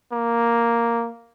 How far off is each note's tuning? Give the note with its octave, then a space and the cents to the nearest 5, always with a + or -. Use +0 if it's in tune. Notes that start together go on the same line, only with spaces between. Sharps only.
A#3 +0